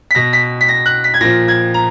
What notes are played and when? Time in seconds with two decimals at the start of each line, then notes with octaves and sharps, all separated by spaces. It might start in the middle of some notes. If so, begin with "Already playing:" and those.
0.11 B6
0.15 B2 A#6
0.33 B6
0.61 B6
0.69 A#6
0.86 F#6
1.04 B6
1.14 G#6
1.21 A#2 F3 A#6
1.48 G#6
1.74 A#5